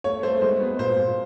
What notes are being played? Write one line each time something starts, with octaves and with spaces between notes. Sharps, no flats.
A3 C#5
A3 C5
G#3 C5
B3
A#2 C5
A#2